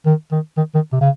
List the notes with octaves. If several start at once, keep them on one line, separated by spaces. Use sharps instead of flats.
D#3
D#3
D#3
D#3
C3
C#3